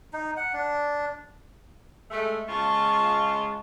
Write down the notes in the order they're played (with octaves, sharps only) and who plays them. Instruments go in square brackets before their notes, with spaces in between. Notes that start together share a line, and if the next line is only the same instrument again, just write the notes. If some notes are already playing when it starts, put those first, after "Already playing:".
[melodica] D#4
F#5
D4
[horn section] G#3 A3
[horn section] C#3 G#3 F4 [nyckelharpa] A5 C#6